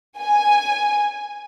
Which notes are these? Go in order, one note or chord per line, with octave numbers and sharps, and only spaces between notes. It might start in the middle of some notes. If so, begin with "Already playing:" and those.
G#5